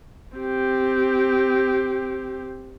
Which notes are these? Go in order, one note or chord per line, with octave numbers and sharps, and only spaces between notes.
C4 G4